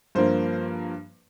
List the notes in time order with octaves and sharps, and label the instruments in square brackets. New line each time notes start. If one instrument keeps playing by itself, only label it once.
[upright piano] G2 F3 A#3 C5